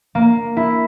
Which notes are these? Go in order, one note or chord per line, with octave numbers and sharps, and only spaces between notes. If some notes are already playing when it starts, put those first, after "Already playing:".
A#3
E4